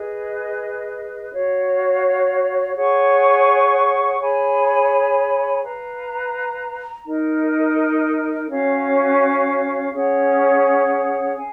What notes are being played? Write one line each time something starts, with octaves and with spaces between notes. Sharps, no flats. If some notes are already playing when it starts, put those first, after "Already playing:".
Already playing: G#4 B4 D#5
F#4 C#5 F5
G#4 C#5 F#5 C#6
G#4 C#5 G#5 B5
B4 F5 A#5
D#4 A#4 D#5
C#4 F#4 C#5 F5
C#4 G#4 C#5 F#5
F5 G#5